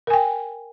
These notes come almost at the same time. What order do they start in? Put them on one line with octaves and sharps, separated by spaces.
A#4 G#5 G5